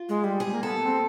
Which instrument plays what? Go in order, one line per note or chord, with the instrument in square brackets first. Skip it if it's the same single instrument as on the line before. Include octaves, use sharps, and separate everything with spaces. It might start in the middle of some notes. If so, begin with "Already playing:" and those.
Already playing: [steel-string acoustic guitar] F4
[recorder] G#3
G3
[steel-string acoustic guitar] G#4
[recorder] A#3
[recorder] B3 [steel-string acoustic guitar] A4
[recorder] B3
C4